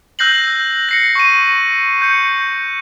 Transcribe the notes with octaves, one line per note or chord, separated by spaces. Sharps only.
E6 F#6 G6 A#6 C7 F#7
A#6 C7 C#7
C#6 D#7
G6 C#7